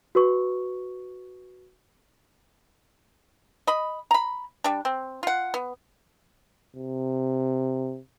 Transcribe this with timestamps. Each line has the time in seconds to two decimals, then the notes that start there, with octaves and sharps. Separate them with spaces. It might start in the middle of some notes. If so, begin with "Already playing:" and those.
0.15 F#4 B4 C#6
3.67 D#5 B5
4.11 A#5 B5
4.64 G3 D4
4.85 C4
5.23 F4 F#5
5.54 B3
6.76 C3